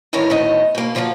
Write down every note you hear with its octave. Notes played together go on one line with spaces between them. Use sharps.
D2 D#3 E3 G3 A#4 C#5
D2 A2 D#3 B3 D#4 D#5
B2 A#3
D3 F3 A#3 F4 F#4